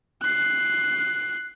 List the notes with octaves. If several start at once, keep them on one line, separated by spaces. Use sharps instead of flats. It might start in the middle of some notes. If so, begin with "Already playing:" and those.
F#6 C7